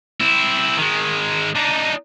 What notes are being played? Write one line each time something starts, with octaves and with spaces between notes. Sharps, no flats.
C4 E4
D#3 G#3
D4 D#4